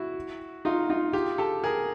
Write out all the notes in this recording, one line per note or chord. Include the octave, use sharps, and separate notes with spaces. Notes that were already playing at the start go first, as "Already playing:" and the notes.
Already playing: E4 F#4
D#4 F4
D#4 F4
F4 G4
G4 A4
G#4 A#4